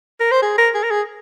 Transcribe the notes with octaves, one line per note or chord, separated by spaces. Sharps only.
A#4
C5
G#4
A#4
G#4
A#4
G#4